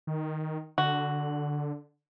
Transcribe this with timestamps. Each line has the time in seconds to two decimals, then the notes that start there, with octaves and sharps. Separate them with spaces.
0.07 D#3
0.78 D3 F#4